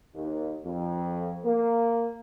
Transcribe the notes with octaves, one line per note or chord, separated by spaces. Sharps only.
D#2
F2
A#3